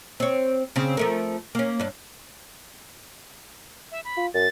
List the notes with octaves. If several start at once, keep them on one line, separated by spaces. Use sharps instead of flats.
C4 C#5
C#3 C4
F3 A3 A#4
A#3 C#4
G2 D4
E5
B5
F4
F#2 A6